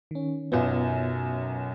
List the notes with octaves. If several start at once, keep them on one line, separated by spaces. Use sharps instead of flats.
D#3 C#4
B1 F#2 F#3 B3 F4